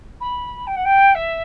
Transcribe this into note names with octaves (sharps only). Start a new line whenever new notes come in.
B5
G5
F#5
G5
E5